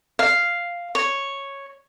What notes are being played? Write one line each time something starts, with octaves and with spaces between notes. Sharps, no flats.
F5
C#5